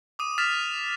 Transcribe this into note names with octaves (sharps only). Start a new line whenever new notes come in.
D6 D#6 D#7
F6 A6 B6 E7 F7